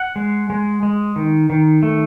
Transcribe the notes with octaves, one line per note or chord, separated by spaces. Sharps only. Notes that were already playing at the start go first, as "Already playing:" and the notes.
Already playing: F#5
G#3
G#3
G#3
D#3
D#3
A3